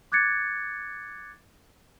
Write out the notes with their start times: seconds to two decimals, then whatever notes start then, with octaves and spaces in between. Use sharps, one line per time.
0.12 D6 F#6 G#6 A6 C#7